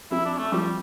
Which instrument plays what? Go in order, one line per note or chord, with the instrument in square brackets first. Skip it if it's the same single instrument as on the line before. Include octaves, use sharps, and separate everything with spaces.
[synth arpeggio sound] F3 C4 F4 [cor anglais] E4
[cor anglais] D4
A3
[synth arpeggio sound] F3 C4 F4 [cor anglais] G3